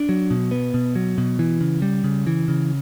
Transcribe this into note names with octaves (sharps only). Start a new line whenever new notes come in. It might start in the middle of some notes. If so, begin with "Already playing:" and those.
Already playing: D4
F#3
B2
B3
B2
F#3
B2
E3
C#3
G3
C#3
E3
C#3